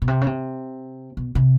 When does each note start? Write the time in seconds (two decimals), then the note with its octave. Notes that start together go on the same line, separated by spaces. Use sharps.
0.02 B2
0.08 C3
0.21 C#3
0.26 C3
1.17 B2
1.35 C3